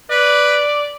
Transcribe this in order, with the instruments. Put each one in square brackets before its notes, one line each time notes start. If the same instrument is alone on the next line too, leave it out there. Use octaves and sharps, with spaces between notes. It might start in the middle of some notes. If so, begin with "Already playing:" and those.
[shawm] B4 [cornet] D5